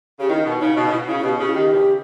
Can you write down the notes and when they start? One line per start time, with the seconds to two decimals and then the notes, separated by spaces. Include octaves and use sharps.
0.20 C#3 G4
0.29 D#3 E4
0.45 B2
0.60 C#3 D#4
0.77 B2
0.89 C#3
0.93 B2 E4
1.08 C#3 E4
1.18 E4
1.24 B2 G4
1.39 C#3 G4
1.47 E4
1.55 D#3 G4
1.72 B2
1.76 C#3